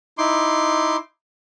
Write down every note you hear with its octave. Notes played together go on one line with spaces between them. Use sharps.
D#4 E4 C6 D6